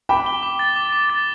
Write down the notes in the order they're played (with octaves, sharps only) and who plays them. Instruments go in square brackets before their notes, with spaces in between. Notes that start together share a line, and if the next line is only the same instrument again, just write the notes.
[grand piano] G5 B5 [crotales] D6
[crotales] G7
D6
A6
D6
D6
A6